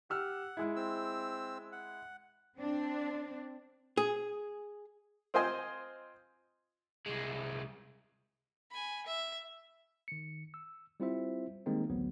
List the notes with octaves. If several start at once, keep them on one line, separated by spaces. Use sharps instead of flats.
G4 F#5 E6 F6
G#3 E4
C4 E6
F#5
C4 D4
G#4
C4 F4 C5 D#5 G#5 C6
C2 G#3
G#5 B5
E5
D#3 C#7
E6
G3 C4 E4 F4 C5 E5
D#3 G3 G#3 A#3 C4 D#4
A1 D2 F#3 B3